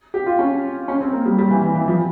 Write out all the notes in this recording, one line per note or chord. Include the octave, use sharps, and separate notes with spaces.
G4
F4
C#4
C#4
C4
A#3
G3
G3
E3
E3
E3
F3